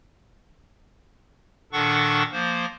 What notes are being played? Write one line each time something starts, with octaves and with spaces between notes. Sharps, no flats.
A#2 D#3 D4 A4 F#5 C#6
F3 A#3 C5